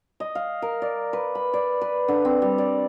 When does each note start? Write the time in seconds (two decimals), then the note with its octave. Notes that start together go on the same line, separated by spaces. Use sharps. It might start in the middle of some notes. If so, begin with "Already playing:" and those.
0.20 D#5
0.35 F5
0.62 A#4
0.82 D5
1.13 B4
1.35 B5
1.54 D5
1.82 B4
2.08 D3
2.25 C4
2.42 G3
2.58 D5